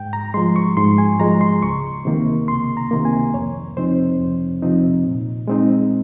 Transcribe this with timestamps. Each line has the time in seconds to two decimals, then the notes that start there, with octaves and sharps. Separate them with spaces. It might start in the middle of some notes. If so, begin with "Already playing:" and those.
Already playing: G#2 G5
0.13 A#5
0.34 F3 G#3 C6
0.56 C#6
0.77 G#2 C6
0.98 G#5
1.20 F3 G#3 A#5
1.41 C6
1.63 C#2 C#6
2.05 C3 D#3 A#3
2.48 C#2 C6
2.77 A#5
2.91 C3 D#3 A#3
3.05 G#5
3.34 F2 C#5
3.77 C3 F3 C4 D#4 C5
4.19 F2
4.63 C3 F3 C4 D#4
5.05 A#2
5.48 G#3 C4 D#4